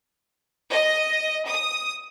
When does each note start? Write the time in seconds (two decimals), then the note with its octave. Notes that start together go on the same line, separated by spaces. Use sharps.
0.71 D#5
1.49 D#6